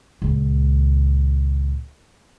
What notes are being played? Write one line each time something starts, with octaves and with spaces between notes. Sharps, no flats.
C#2 A#2